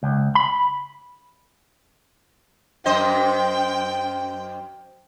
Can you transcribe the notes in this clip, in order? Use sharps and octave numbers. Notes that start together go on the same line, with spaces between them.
C#2
B5
F#2 C5 D#5 G5